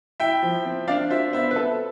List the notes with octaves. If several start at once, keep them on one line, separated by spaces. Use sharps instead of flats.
E4 E5 G5
F3
C4
D4 D5 F5
F4 C5 E5
B3 C5 E5
B4
C4 A4